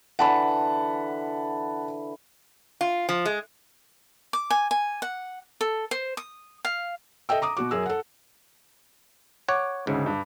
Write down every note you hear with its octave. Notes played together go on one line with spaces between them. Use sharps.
D3 E3 F#5 A5 B5
F4
F3
G#3
D6
G#5
G#5
F#5
A4
C5
D#6
F5
A4 D#5 E5 G5 E6
A#5 D6 D#6
B2 F#4 D6
F#2 G#4 A#4 E6
A4 F#5
C#5 F#5 D6
D2 G#2 C#3
G2